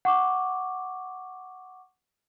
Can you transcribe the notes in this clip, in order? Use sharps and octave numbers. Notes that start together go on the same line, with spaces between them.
F#5 C#6 D6